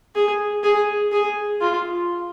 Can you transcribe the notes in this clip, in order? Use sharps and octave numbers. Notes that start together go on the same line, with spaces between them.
G#4
G#4
G#4
F4